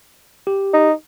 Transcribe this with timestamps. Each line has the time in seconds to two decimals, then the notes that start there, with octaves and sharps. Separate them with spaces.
0.47 G4
0.74 D#4